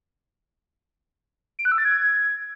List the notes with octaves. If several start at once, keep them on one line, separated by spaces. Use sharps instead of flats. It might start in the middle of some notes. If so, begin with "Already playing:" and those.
D7
F#6
E6
A6
G#6